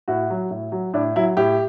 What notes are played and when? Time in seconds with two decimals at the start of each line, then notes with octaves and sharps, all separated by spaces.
0.08 A2 F#4
0.30 F#3
0.50 A2
0.72 F#3
0.94 A2 D4
1.16 F#3 E4
1.37 A2 G4